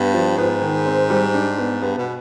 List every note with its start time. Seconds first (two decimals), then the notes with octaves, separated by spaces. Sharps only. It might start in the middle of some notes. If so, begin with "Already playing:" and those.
Already playing: G2 B3
0.14 F3
0.38 G#2 B3
0.62 D#3
0.86 C4
1.10 G3
1.34 D4
1.58 B3
1.82 G2 B3
1.98 B2